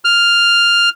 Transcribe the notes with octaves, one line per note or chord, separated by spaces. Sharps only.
F6